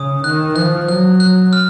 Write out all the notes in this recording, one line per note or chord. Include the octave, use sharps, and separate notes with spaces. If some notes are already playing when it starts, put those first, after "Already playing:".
Already playing: C#3 D#6
D#3 F#6
F3 F#6
F#3 F#6
F#6
F6